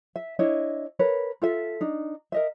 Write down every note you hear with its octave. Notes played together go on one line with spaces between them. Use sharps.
E5
D4 E4 C#5 D#5
A#4 B4 C#5
F4 A4 E5
D4 D#4
A#4 D#5 E5